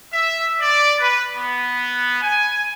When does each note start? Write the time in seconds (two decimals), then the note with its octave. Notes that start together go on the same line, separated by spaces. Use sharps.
0.13 E5
0.60 D5
1.00 B4
1.36 B3
2.22 G#5